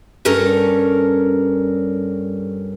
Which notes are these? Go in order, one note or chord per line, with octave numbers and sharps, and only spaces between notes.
G2 G3 C#4 A4 A#4 C#5